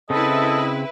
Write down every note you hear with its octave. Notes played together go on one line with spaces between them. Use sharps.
C#3 C4 E4 A4 B4 D#5